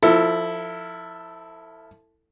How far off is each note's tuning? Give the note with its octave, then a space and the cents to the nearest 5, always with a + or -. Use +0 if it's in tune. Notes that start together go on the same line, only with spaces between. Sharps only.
F3 +0 E4 -5 A4 +25